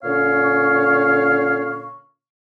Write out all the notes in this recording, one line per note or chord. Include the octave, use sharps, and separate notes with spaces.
A#2 D3 C#4 C#5 F5 C#6